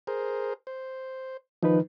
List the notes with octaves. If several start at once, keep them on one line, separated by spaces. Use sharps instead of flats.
G#4 A#4 C5
C5
D#3 F3 D#4 B4